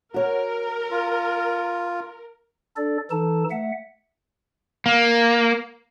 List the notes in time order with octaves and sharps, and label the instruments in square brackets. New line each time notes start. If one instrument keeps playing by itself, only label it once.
[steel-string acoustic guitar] F#4 C#5 [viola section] A#4
[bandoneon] F4
[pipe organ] D4 A4 D5
E3 D#4 A4 A5
A3 E5 F#5
[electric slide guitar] A#3